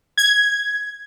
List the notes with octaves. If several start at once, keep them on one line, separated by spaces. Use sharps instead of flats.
G#6